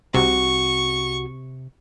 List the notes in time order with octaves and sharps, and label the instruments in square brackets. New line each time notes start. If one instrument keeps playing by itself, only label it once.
[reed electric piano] C2 F#4 [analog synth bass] C3 [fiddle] C#6